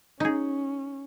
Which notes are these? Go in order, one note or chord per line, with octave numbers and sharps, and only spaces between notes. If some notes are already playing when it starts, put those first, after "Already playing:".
C#4 D#4 G#4